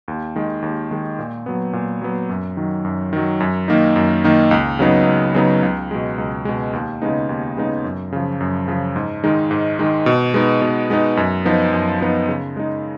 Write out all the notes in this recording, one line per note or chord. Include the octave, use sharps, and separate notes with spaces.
D#2
D#3 G#3
D#2
D#3 G#3
A#2
F#3 B3
A#2
F#3 B3
F#2
D#3 F#3
F#2
D#3 F#3
F#2
D#3 A#3 D#4
F#2
D#3 A#3 D#4
C#2
C#3 F#3 B3 D#4
C#2
C#3 F#3 B3 D#4
C#2
B2 G#3
C#2
B2 G#3
D#2
C#3 G#3 B3 D#4
D#2
C#3 G#3 B3 D#4
F#2
C#3 F3
F#2
C#3 F3
G#2
D#3 G#3 D#4
G#2
D#3 G#3 D#4
B2
G#3 B3 D#4
B2
G#3 B3 D#4
F#2
F3 B3 D#4
F#2
F3 B3 D#4
C#3
G#3 D#4